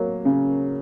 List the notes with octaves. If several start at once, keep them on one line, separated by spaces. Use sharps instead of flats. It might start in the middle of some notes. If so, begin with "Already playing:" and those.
Already playing: F#3 A#3
C#3